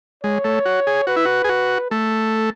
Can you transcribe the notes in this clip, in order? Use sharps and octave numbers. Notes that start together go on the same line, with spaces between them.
G#3 C#5
A3
F#4
G#4
F#4 B4
E4
F#4
G#4
F#4
A3 A4